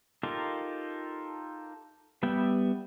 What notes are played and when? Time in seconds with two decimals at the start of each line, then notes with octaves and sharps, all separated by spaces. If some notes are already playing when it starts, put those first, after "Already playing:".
0.23 D#4 F4 G4 A4 A#4
2.23 G3 B3 E5 G5